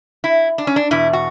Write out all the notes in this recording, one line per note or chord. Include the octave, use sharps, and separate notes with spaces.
E4
D4
C#4
D4
E2 B2 E4
F#4